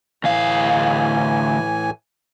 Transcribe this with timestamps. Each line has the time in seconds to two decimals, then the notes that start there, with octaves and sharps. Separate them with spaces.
0.24 D2 A2 E3 F5 G#5